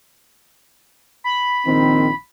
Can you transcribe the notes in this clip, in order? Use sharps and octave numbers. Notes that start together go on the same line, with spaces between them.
B5
A#1 D#3 C4